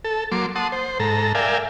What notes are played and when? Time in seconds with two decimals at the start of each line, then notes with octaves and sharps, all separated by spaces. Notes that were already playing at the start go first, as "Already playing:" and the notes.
0.05 A4
0.32 F#3 A#3 C6 D6
0.56 F#5 A5 C6 D#6
0.72 C5
1.00 G#2 A4 A#5
1.35 A#4 D5 E5 F5 G5 G#5